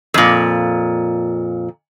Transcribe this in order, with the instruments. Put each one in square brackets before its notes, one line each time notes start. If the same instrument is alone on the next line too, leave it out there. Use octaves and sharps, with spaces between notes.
[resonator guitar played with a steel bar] F2 A#2